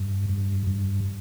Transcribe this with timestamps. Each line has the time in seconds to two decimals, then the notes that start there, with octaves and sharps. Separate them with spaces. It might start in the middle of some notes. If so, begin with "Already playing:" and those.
Already playing: G2
0.29 G2
0.67 G2